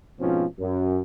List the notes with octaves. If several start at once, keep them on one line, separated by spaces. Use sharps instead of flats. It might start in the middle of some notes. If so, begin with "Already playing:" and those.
G#2 B2 F3 C4 C#4 F4
F#2